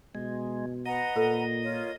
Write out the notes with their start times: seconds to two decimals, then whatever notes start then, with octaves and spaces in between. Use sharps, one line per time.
0.15 B2 G#3
0.86 B4 D#5 F#5 A#5
1.16 A#2 A4
1.62 F4 A#4 C#5